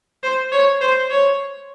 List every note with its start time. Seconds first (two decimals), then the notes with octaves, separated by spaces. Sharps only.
0.23 C5
0.52 C#5
0.81 C5
1.10 C#5